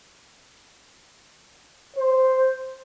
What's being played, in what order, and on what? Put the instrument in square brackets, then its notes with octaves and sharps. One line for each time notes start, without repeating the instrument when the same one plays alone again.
[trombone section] C5